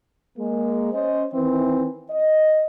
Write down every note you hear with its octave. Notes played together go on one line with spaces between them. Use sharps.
G#3 A#3
C#4 C5 D#5
D#3 E3 C4
D#5